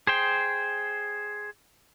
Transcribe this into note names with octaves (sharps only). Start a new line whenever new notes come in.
G#4 C5 G5